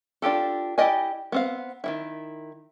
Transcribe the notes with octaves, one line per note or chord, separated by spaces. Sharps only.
D4 F4 G4 A4
E4 G4 D5 D#5 G#5
B3 C4 F5
D#3 F3 E4